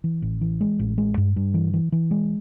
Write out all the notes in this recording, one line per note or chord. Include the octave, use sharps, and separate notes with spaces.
E3
A1
E3
G#3
A1
G#3
G2
G2
E3
E3
E3
G#3